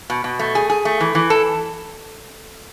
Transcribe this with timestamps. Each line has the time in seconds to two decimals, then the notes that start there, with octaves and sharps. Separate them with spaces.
0.10 B2
0.24 B2
0.39 A3
0.55 G#4
0.70 G#4
0.85 A3
1.00 E3
1.15 E3
1.30 A4